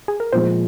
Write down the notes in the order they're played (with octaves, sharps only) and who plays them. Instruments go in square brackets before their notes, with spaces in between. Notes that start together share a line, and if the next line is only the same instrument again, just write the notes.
[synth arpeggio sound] G#4
A#4
[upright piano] A#2 F3 G#3 [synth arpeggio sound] C5